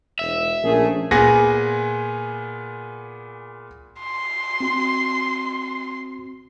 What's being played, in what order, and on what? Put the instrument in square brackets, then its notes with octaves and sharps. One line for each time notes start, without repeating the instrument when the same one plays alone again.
[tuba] E1 [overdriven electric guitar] E5
[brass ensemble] A#1 A3 G#4 [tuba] C#4 [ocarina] A#4
[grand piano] A#2 B3 G#4 F#5 G#5 A#6
[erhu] C6
[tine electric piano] C4 F#4